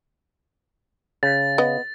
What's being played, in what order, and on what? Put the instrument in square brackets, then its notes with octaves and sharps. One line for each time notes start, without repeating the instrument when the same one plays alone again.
[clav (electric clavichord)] C#3 [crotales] A6
[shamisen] B3 D#5